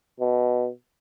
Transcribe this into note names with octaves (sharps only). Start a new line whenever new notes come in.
B2